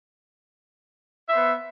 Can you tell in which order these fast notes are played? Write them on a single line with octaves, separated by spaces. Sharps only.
E5 C5 B3